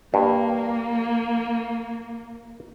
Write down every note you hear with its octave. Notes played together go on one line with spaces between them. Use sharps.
G2 A#3